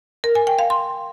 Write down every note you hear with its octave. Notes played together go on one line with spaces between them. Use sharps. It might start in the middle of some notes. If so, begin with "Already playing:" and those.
A#4
G#5
G5
F5
C6